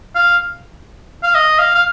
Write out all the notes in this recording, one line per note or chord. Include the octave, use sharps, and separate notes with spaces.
F5
F5
D#5
F5
F5